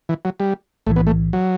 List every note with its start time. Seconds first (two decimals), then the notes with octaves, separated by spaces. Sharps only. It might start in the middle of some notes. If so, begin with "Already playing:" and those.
0.09 E3
0.25 F#3
0.40 G3
0.87 B1 A2 E3 A3
0.96 B3
1.07 A3
1.33 F#3